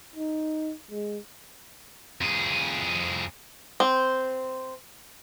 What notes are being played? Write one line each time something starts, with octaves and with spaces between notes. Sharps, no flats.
D#4
G#3
F2 G#4
C4